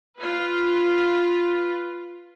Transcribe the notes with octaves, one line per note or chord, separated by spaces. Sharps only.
F4 B4